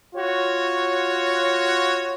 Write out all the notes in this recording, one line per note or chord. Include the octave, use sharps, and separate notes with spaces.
F4 F#4 C#5